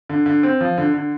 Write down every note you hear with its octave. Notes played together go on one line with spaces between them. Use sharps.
D3
D3
C4
F3
D3
D3